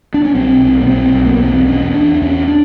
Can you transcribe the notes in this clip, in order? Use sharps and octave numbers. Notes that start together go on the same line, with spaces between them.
D4
C#4
B1 C4
B1
B3
B1 C4
B1
A#3
B3
E2 C4
E2 C#4
E2 D4
D4
E2 C#4
D4